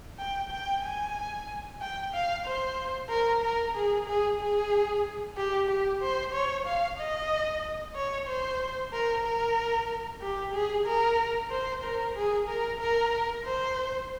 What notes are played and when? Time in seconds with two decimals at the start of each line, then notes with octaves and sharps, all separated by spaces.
0.19 G5
0.51 G5
0.83 G#5
1.81 G5
2.13 F5
2.46 C5
3.09 A#4
3.42 A#4
3.75 G#4
4.06 G#4
4.40 G#4
5.37 G4
5.68 G4
6.01 C5
6.34 C#5
6.66 F5
6.98 D#5
7.95 C#5
8.27 C5
8.92 A#4
9.24 A#4
10.22 G4
10.54 G#4
10.86 A#4
11.50 C5
11.83 A#4
12.15 G#4
12.48 A#4
12.80 A#4
13.45 C5